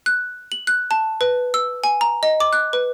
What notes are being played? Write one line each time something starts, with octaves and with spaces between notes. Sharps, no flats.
F#6
F#7
F#6
A5
B4
E6
G#5
A#5
D#5
D6
F#6
B4